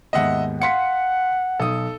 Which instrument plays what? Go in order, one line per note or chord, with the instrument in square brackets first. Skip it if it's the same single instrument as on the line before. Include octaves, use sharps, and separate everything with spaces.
[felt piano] D#2 G#2 B3 [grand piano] D#5 E5 F#5
[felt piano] F5 C6 B6 [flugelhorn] F#5 [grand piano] C#7
[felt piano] B1 [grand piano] A4 D#6